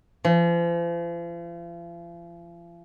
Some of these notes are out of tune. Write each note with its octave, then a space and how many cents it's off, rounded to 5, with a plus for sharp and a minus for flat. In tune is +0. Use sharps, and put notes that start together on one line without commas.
F3 -40